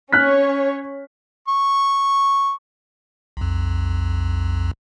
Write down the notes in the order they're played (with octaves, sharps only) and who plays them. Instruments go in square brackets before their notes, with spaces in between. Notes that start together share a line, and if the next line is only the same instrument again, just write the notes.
[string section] C#4 C#5 [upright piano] F6 F#6 B6
[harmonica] C#6
[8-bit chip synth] B1 F2